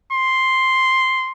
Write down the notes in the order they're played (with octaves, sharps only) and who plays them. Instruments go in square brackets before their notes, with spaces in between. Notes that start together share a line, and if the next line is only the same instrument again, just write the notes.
[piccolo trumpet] C6